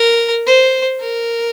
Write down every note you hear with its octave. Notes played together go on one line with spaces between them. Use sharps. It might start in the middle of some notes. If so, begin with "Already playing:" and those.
Already playing: A#4
C5
A#4